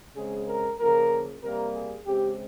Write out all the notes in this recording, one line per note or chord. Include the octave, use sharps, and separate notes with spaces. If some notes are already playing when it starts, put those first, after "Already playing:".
C#3 G#3 C4 G#4
A#4
C#3 F3 A#3 A#4
C3 G3 A#3 A#4
G#4
C#3 G#3 C4 G4